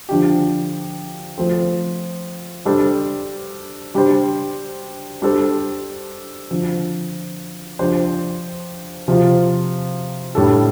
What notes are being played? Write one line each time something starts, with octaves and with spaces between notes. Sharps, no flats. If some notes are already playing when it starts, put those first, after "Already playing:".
D3 F3 D4 G4
F3 A3 C4 A4
G3 D4 A4 C5
G3 D4 G4 C5
G3 D4 A4 C5
D3 F3 C4
F3 D4 G4 C5
C3 F3 C4 F4
A2 G3 D4 A4